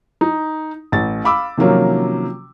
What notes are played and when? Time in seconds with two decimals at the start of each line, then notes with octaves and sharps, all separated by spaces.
0.21 D#4
0.92 A1 A6
1.24 F5 B5 D6 E6
1.57 C3 D#3 F3 F#3 A#3 C#4